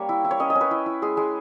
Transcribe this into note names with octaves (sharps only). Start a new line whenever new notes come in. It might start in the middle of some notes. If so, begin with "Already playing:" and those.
Already playing: G3 A#3 C#4 C#5
E4
E4
C#5
C#4 D#5
D#5
C#4
B4
E4
E4
G#3 G#4
G#3